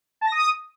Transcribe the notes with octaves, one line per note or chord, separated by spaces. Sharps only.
A5
A#6
D#6